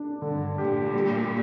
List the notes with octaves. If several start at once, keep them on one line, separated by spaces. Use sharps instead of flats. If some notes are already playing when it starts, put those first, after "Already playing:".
Already playing: D4
G2 D3
A#2 G4
G3